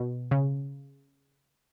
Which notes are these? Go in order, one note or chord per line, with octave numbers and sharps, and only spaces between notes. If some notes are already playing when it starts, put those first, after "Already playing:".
Already playing: B2
C#3